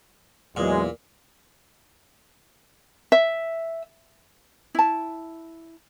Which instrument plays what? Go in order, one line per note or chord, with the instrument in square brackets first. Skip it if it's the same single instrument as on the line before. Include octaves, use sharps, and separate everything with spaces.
[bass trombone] E2 [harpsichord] A#2 [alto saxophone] F#3 [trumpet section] G#3
[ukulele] E5
E4 A5